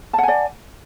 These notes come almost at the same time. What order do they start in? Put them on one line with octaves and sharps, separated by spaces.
A5 F#5 G#5 D5